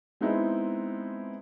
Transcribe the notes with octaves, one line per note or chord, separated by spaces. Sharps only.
G#3 B3 C4 D#4 E4